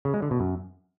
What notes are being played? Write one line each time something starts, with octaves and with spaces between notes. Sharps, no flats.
C#3
G#3
D3
B2
F#2